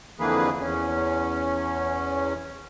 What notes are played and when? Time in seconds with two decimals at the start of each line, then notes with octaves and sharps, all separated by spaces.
0.20 F2 D3 E3 A#3 G#4 B4
0.61 E2 C#4